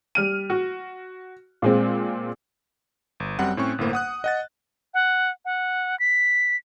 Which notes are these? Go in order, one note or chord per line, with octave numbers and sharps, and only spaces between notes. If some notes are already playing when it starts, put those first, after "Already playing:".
G3 F6 D#7
F#4
A#2 G#3 C4
G1
F#2 G3 C4 F#5 F#6
A2 C4 C#4 C#5 C#6
G1 A2 A#3 C5
F#5 D#6 F#6
D#5 F#5 A6
F#5
F#5
B6